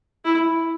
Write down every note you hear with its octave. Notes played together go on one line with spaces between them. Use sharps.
E4